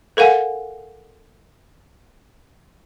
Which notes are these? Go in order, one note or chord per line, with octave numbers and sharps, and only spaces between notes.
A4 A#4 F5 F#5 G#5